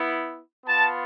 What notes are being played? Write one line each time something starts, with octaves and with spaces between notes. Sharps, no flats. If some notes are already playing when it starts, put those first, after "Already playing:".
Already playing: B3 E4
B3 F4 A5